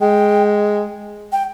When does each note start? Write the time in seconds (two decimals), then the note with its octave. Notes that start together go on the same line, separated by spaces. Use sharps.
0.01 G#3 G5
1.32 G5